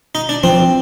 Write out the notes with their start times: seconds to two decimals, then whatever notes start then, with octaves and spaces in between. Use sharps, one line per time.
0.15 D#4
0.29 D4
0.43 F3 C4